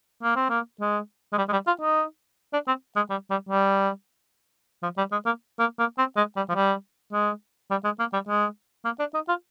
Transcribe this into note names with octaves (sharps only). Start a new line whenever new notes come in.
A#3
C4
A#3
G#3
G#3
G3
G#3
G3
F4
D#4
D4
C4
G#3
G3
G3
G3
F3
G3
G#3
A#3
A#3
A#3
C4
G#3
G3
F3
G3
G#3
G3
G#3
A#3
G3
G#3
A#3
D4
D#4
F4